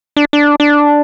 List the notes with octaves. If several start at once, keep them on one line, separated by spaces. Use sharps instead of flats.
D4
D4
D4